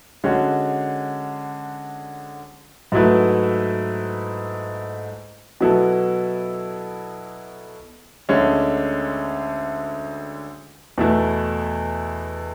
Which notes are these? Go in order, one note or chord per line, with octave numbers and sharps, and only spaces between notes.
D3 G#3 C#4 F#4
G#2 F#3 A3 E4 B4
B2 F#3 B3 E4 A4
D2 D3 G#3 C#4
E2 B2 A3 E4 B4